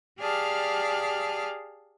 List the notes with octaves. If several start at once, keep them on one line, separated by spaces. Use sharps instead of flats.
G4 G#4 D5 F5 A5 F6